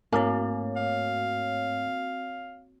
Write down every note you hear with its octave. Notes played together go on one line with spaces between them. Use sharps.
G#2 A3 A#3 C4 F#4 C#5
F5